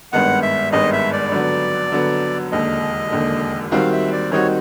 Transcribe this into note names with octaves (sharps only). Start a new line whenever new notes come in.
G#1 G2 D#3 G#3 B3 F#5
E5
G#1 G2 D#3 G#3 B3 D#5
E5
D5
D3 F#3 B3
D3 F#3 B3
E1 D#2 D3 D#5
E1 D#2 D3
D#3 G3 C4 D#4 F#4 F5
E5
D5
D#3 G3 C4 D#4 F#4 C#5